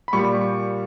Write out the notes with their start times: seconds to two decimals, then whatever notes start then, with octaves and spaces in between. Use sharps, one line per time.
0.08 B5
0.13 A#2 G3 C#6